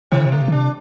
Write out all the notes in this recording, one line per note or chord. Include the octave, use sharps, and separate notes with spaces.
C3 D#3
D3
C3
D3 A3
C3
D3
C3 D4